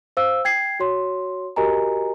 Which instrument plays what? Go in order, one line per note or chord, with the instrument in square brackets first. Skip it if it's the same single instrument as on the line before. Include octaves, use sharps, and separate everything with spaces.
[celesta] C5 F5 E6
G5 G#6 C7
F#4 C#5 C6
F#4 G4 A#4 D#5 G#5 A#5